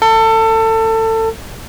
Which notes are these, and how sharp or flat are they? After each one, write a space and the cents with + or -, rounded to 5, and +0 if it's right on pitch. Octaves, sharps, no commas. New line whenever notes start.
A4 +25